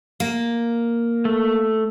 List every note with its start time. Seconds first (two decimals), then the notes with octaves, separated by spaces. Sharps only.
0.20 A#3
1.25 A3